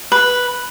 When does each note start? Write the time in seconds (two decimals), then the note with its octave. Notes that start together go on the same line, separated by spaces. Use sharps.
0.12 B4